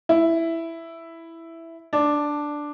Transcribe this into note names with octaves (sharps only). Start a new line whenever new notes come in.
E4
D4